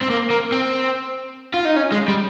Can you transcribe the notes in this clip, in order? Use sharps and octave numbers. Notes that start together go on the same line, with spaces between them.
C4
A#3
A#3
C4
F4
D#4
C#4
G#3
G3